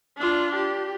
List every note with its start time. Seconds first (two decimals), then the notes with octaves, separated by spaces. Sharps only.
0.17 D4 F4
0.55 G4